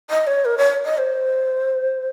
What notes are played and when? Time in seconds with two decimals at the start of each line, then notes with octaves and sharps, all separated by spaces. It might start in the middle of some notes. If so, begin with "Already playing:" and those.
0.10 D#5
0.27 C#5
0.45 A#4
0.58 C#5
0.85 D#5
0.98 C5